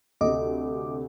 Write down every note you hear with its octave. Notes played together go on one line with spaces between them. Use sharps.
D2 C3 D#5 D6